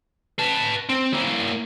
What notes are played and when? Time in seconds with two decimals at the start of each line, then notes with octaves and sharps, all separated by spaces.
0.39 B4 A5
0.89 C4
1.13 A#3 E4